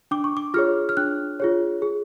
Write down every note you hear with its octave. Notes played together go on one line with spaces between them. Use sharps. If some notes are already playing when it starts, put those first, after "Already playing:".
D4 D6
C#6
D6
F4 G#4 C#5 F6
F6
D4 F#6
F4 G#4 C#5
G#4